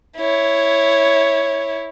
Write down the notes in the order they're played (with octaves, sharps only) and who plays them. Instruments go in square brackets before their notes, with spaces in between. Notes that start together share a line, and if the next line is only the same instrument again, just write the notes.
[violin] E4 C#5